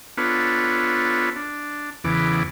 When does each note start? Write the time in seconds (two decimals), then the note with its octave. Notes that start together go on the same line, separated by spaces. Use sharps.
0.18 B3 D4 F4 A4 B4 C#5
1.36 D4
2.04 E2 C#3 E3 B3 D6